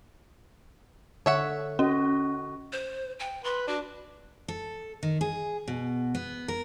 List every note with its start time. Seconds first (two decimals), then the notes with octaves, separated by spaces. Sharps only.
1.26 D3 C#5 E5 F#5
1.79 C#4 F#4 D#5
2.73 C5
3.20 G5
3.44 B4 C6
3.67 D4 F#4
4.48 A4
5.03 D#3
5.21 G#4
5.68 B2
6.15 B3
6.48 A#4